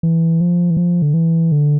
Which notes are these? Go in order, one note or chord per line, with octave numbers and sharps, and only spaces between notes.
E3
F3
E3
F3
D3
E3
D3